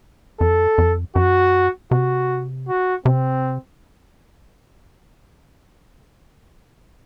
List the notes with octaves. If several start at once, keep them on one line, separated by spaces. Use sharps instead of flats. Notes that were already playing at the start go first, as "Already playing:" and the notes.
F2 A4
F2
F#2 F#4
C3 F#4
F#4
C3 C4